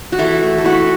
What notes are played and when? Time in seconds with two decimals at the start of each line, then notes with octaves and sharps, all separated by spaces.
0.12 F#4
0.18 E3 E4 A4
0.41 A3
0.58 A4
0.64 E3 F#4 B4